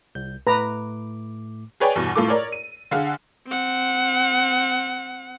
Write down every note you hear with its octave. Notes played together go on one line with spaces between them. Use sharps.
C2 G6
A2 A3 B4 A#5 D6
G#4 B4 C#5 D5 G5 G#5
E2 G2 B2
A2 F4 A4 D6
A#4 C#5 D5
D#7
D3 G#4 F5 F#5
C4 F#5